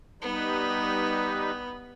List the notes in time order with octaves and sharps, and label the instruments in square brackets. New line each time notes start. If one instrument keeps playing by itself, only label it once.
[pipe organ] G3 D#4 B4 [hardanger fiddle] B3